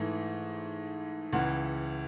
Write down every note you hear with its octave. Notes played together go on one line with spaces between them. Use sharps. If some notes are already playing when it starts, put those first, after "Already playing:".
Already playing: G#2 E3 A3
C#2 C#3 E3 F#5